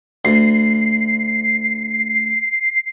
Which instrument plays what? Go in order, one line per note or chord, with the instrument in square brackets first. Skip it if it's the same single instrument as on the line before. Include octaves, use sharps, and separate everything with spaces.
[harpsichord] D2 [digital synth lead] C7